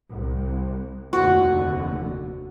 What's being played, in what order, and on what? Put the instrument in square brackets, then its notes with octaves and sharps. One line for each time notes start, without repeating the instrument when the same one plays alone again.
[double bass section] C2
[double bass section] F1 D#2 D3 [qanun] F#4